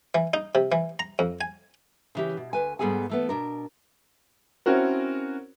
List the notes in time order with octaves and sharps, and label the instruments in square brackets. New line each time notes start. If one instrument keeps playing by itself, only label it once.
[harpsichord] E3
D#4
C3
E3
A#5
F2
G#5
[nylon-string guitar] C#3 E3 G4
B2
D2 B4 G#5
G#2 G3 B3 G#4 A4 G#5
E3 A3 B3
B2 D4 A#4
[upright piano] C4 C#4 E4 F#4 A#4